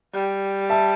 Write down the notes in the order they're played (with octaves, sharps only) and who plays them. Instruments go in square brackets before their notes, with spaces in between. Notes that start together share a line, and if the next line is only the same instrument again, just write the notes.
[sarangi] G3
[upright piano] E5 A5